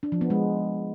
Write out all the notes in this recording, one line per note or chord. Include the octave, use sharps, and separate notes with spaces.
D4
F3
B3
G#3